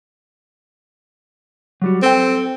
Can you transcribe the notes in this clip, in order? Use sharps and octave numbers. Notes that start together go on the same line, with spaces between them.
F#3 G3 F#4
C4 A4 G5